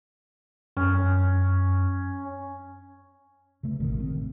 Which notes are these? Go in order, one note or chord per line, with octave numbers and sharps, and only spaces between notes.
F#2 C#4
C#3 A3
A1 C3 D#3
D#3 C4